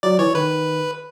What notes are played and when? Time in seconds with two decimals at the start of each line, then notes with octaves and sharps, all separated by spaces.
0.03 F#3 D5
0.19 E3 C#5
0.34 D#3 B4